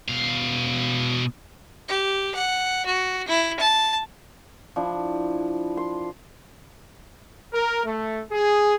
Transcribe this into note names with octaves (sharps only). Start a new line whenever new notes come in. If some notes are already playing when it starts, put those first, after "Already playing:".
B2 F5
G4
F#5
F#4
E4
A5
F3 D4 E4
C6
A#4
A3
G#4